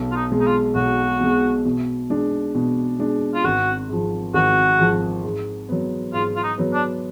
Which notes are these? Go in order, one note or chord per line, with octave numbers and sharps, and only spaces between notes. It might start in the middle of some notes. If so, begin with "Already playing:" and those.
Already playing: B1
F4
D#4
B2 G#3
D#4
F4
B1 F#4
B2 G#3
B2
G#3 D4
B2
G#3 D4
F4
G#1 F#4
G#2 F3
G#1 F#4
G#2 F3
G#2
F#3 B3
G#2 F4
F4
D#4
F#3 B3
D4